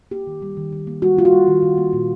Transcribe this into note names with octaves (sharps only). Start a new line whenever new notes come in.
A#3 G4
D#3
G3
D#3
D#3
A#3
G3 F#4
A#3 F4
F#4
G3
D#3
D#3
A#3
A#2